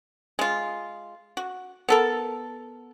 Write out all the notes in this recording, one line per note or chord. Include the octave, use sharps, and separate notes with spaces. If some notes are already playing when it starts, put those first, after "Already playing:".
G#3 F4
F#4
B3 A4 A#4